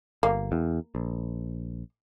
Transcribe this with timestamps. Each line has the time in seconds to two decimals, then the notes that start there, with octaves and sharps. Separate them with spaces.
0.23 G1 A#3
0.52 E2
0.95 A#1